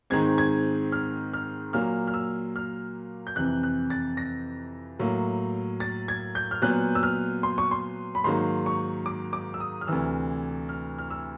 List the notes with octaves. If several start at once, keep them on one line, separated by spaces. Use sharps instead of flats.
G#2 D#3 G#3 C4 G#6
G#6
F6
F6
A#2 F#3 A#3 F6
F6
E6
F6
G6
F2 C3 E3 F#6
F#6
A6
A#6
A2 F#3 A#3
A6
G#6
G6
F6
A#2 F#3 B3 F#6
E6
F6
C6
C#6
C6
B5
G#2 D#3 F#3 A#3 C6
C#6
D6
D6
E6
D#6
F6
D2 C3 E3 E6
F6
F6
E6